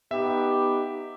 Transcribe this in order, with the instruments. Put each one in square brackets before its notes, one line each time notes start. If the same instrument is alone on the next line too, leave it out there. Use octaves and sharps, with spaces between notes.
[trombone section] B3 D#4 G4 [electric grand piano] E5